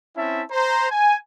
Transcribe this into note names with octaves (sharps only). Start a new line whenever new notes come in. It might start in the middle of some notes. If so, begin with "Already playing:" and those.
C4 C#4 E4 E5 A5
C5 A#5
G#5